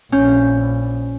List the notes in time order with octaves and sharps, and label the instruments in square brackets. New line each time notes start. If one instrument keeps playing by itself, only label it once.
[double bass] A#1 [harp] C#4 G6